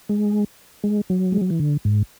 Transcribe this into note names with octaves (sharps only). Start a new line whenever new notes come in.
G#3
G#3
F#3
G#3
F#3
E3
D3
G#2